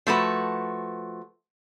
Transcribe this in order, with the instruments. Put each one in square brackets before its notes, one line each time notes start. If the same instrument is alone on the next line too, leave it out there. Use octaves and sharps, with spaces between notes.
[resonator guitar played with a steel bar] F3 A3 F#4 B4